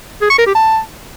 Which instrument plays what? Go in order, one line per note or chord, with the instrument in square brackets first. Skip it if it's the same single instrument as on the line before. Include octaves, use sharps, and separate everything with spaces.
[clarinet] G#4
C#6
A#4
G4
A5